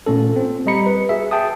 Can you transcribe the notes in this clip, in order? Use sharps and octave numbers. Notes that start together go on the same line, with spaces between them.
A#2 A3 C#4 A4
C4 F4
G3 G4 D#5 A#5 B5 C#7
B4
F#4 G#4 E5
G#4 G5 A5 D#6